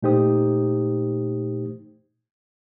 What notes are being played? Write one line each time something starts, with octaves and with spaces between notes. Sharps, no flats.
A#2 A3 D#4 G4 C5 D#6